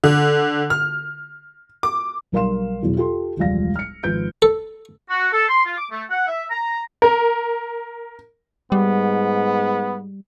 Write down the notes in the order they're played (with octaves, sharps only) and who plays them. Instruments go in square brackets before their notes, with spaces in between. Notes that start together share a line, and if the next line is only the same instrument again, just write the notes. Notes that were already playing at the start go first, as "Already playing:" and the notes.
[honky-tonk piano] D3
F6
D6
[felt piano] B1 G3 A#4 F5 C6 E7
E2 B2 E3 F#3
F4 G4 A4 C6
E1 C#2 F3 G3 F5 A#6
F6 C#7
G#1 F3 B4 G6 D7
[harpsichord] A4
[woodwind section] F#4
A4
C6
F4
D6
A3
F#5
E5
A#5
[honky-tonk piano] A#4
[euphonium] G#2 [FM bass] G3 [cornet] B3